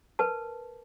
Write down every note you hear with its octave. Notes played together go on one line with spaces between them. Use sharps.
A#4 B4 A5